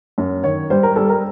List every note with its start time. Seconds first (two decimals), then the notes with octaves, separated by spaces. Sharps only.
0.18 F#2
0.44 D#3 C#5
0.70 G3 C5
0.83 A#4
0.96 G3 A4
1.09 A#4